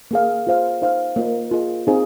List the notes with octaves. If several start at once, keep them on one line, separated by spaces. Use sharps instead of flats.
A#3 G#4 F5
F4 G#4 C5 F5
D#4 C5 F5
A#3 F4 A#4 D#5
F4 G#4 D#5
C4 D#4 G#4 C5 F5